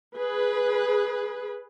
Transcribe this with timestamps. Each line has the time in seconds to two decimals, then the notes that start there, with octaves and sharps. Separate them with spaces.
0.18 G#4 B4